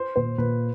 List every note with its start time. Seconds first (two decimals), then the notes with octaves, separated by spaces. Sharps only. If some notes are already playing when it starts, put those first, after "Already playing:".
Already playing: C5
0.16 A#2 C5
0.38 A#2 B4